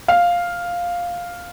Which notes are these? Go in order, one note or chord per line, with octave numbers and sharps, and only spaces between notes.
F5